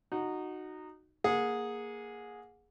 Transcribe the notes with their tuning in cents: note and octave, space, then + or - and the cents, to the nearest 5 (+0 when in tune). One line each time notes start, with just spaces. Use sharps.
D#4 -15 F#4 +0
A#3 +0 G#4 +0 F#5 -30